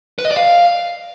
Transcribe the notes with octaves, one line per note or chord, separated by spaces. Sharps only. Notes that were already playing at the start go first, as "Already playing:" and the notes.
B4
D#5
D5
F5